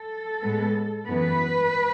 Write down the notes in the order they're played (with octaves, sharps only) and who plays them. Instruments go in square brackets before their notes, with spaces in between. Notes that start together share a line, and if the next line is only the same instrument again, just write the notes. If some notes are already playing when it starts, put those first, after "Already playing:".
Already playing: [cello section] A4
A2 G#3 B3
F#2 E3 B3 B4